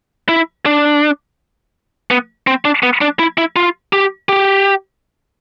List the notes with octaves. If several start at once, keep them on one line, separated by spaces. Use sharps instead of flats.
E4
D4
B3
C4
D4
B3
D4
E4
E4
F4
G4
G4